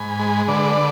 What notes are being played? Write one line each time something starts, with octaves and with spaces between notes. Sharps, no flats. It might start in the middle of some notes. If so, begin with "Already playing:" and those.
Already playing: G#2 G#5 B5
G#3
D3 B4 D5